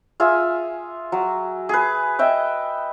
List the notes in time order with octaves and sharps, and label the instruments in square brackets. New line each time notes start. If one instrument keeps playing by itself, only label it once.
[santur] F4 G#4 E5
F#3
G#4 B4
D#5 E5 G5